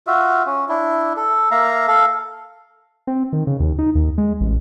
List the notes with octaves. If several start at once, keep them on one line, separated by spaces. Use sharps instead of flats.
F4 F#4 E5
C#4
D4 E4
A4
A#3 E5 F5 A#5
A4 F5
C4
D#3
C#3
D#2
D#4
D#2
G#3
A1